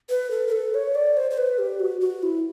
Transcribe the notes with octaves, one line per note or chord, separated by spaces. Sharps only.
B4
A4
A#4
A4
C#5
D5
C5
C5
B4
G4
F#4
F#4
E4